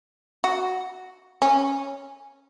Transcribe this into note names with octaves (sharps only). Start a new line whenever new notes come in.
F#4
C#4